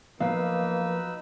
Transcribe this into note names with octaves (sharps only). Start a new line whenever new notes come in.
F3 F#3 A#3 B3 D#4 B4 F5 E6